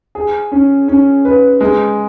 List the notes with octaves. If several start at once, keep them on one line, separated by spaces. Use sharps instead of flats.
G#4
C#4
C#4
B4
G#3